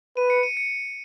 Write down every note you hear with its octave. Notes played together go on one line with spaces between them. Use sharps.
B4 D#7
C#7
D#7
C#7